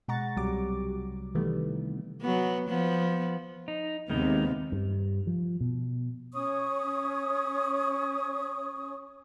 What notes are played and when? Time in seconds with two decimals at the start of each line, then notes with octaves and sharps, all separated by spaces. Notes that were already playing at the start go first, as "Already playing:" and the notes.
0.08 B2 G#3 F#5 A#5 C#6 A6
0.36 C2 C3 F#3 G3 G4 D6
1.35 C3 D#3 E3 G3 A3 B3
2.21 F#3 B3
2.69 F3 B3
3.68 D#4
4.10 D#2 C3 D#3 G#3 B3 D#4
4.72 G2
5.27 F3
5.61 B2
6.34 C#4 C#5 C#6 D#6